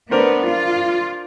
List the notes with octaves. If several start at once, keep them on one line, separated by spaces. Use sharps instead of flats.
B3 D4 A#4 C5
F4